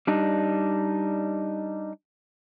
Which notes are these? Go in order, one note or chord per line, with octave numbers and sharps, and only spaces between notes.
G3 D4 D#4